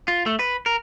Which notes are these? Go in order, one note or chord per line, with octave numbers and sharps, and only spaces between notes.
F4
A3
B4
A#4